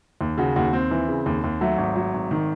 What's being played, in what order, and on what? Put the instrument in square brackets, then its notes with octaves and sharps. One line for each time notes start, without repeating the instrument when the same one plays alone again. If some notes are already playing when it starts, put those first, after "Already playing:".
[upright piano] D#2
C#3 F#4
D#2 F#4
D#2 C4
E3
C#3
D#2
D#2
F#3 A3
G#1
F#3
G#1
D#3